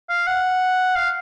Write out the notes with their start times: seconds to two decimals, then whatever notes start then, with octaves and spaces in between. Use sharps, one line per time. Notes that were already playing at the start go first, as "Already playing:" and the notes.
0.10 F5
0.27 F#5
0.96 F5